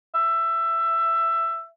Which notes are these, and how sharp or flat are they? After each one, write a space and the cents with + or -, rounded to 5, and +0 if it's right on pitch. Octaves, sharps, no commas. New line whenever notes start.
E5 +15